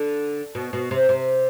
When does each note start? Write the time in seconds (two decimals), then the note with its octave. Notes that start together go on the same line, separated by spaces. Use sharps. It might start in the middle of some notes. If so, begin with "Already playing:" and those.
Already playing: D3
0.55 B2
0.73 B2
0.91 C3
1.09 C3